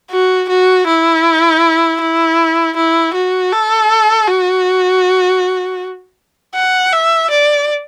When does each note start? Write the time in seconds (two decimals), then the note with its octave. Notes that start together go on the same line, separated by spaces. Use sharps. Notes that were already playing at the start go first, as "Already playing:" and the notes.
0.11 F#4
0.49 F#4
0.87 E4
2.00 E4
2.76 E4
3.14 F#4
3.52 A4
4.27 F#4
6.55 F#5
6.92 E5
7.30 D5